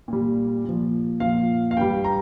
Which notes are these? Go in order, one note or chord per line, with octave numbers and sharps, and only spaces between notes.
A#2 G3
A#2 F3
A#2 F3 F5
F5
G2 G3 G5
A#5